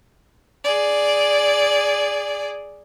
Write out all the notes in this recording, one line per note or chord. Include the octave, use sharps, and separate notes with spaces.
G#4 D5